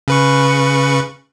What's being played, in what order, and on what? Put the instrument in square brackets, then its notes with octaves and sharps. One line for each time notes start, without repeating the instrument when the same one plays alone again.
[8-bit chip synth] C#3 B4 C#6